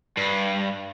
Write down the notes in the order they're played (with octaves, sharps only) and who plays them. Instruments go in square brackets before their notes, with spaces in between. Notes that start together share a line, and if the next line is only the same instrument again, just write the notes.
[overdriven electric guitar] G2